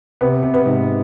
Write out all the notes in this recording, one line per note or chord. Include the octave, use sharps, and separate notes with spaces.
C3 B3
C3
B3
G#2